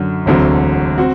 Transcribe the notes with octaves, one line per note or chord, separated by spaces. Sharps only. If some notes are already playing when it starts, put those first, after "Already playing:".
Already playing: F#2 D3 F#3
E1 D2 D3 F#3 C4
C4 F#4